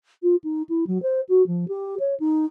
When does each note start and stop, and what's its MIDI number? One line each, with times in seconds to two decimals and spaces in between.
0.23 0.36 65
0.44 0.63 63
0.69 0.85 64
0.87 1.01 54
1.03 1.21 72
1.29 1.45 66
1.47 1.65 53
1.68 1.95 67
2.00 2.15 73
2.20 2.46 63